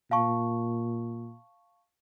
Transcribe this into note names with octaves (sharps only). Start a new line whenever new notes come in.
A#2 F5 A5 C#6